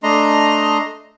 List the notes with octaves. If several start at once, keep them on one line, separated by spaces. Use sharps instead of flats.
A3 D4 D#5 A#5 C6